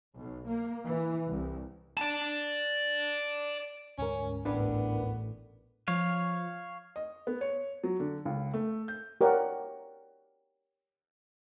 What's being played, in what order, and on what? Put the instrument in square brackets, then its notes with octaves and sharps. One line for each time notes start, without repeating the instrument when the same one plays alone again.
[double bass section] B1
A#3
E3
C2
[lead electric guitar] D5 A5
[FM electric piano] D2 G#2 A#4 [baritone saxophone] C#4
[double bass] A1 [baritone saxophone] B3 [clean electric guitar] D4 B4
[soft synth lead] F3 [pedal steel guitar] C#5 F5
[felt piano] D#5
B3
C#5
F#3
D3
C#2
A3
G6
[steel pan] G4 A#4 C#5 D5 F#5